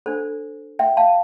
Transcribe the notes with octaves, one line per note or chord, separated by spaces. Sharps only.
D4 A4 C5
E5 G5
F5 A5